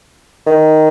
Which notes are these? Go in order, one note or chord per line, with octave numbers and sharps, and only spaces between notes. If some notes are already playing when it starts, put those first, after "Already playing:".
D#3